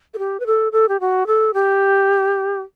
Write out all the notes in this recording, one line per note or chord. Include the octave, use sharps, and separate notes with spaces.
A4
G4
B4
A4
A4
G4
F#4
A4
G4